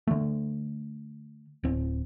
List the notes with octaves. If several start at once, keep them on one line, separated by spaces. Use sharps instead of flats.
D3 A3
D1 C4